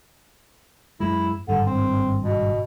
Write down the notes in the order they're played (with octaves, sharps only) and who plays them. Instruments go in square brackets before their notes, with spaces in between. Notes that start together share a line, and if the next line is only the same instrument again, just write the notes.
[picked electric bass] F#2 G#3 [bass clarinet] E4
[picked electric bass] G#1 G2 [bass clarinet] D3
[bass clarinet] C4
B2